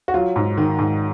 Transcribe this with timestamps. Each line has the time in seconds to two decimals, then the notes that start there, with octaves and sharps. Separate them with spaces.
0.08 F#4
0.14 F#3 F4
0.36 G#2
0.57 D#3
0.79 G#2